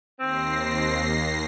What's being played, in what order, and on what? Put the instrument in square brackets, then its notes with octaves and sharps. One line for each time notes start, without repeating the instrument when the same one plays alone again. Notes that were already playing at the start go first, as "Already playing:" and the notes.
[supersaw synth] D#2 A#6 C7 [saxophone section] C4